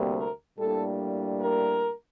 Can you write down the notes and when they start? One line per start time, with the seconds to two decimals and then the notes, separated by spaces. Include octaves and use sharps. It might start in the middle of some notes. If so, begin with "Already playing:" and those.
Already playing: D2 C3 G3 A#3
0.17 A#4
0.58 A2 G3 A#3 D4 A4
1.41 A#4